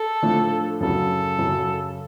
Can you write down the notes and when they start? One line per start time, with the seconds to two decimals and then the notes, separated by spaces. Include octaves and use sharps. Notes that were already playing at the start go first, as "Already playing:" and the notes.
Already playing: A4
0.22 A2 F3 A3 D4
0.80 F#2 C#3 F#3 A4
1.39 F#2 C#3 F#3